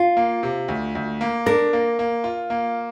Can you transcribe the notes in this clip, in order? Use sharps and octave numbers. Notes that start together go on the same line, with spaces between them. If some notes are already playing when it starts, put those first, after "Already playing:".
Already playing: F4
A#3
C3
D2
D2
A#3
D4 A#4
A#3
A#3
F4
A#3